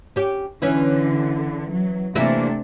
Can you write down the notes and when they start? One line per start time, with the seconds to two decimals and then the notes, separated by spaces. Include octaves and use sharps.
0.16 C#4 G4
0.62 D3 E3 C#4 E4
1.71 F#3
2.15 C3 E3 A3 A#3 D4 E5